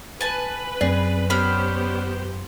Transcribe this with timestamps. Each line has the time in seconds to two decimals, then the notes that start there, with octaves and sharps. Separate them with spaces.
0.21 B4 G#5 A5
0.81 F#2 C4 G#4 D5
1.30 B3 C#4 D4 G4 B4 C5 B5